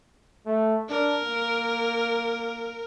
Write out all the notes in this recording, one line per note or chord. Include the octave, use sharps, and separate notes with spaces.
A3
D4 A#4
A#3